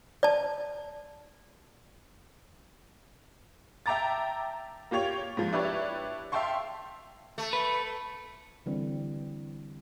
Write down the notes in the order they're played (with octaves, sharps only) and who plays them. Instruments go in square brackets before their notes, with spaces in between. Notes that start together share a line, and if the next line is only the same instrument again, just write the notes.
[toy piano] D5 A5
[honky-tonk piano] E5 G5 A5 A#5 D6 A6
A#3 F4 G4 C#5 F7
G#2 F3
D4 E4 G4 B4 C#5 D5
E5 F5 G5 A5 C6 C#6
[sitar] A3
[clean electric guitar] B4
[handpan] D3 E3 G3 C4